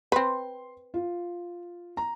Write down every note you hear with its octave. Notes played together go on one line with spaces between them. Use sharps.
C4 B4 C6
F4
A#5